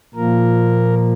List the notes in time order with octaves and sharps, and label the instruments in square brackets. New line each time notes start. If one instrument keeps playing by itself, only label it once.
[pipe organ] A#2 F3 A#3 A#4